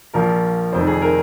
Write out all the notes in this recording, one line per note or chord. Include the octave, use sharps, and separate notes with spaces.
A#1 A#2 F3 A#4
F1 F2 D#3 C5
G#4
A#4